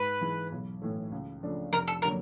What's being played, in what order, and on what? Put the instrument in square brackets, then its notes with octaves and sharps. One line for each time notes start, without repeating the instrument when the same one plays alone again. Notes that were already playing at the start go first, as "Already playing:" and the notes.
Already playing: [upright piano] G#2 [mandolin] B4
[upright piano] E3 G#3
B1
A2 E3 A3
C#2
C#3 F3 A3 D4
[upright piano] F1 [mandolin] A#4
[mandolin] A4
A#4
[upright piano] D3 F#3 A#3